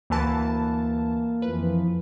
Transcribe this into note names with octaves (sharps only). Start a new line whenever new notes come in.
D2 E3 A#3 A5
F2 E3 F3 B4